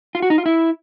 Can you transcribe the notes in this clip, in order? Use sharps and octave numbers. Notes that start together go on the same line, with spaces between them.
F4
F#4
D#4
F4
E4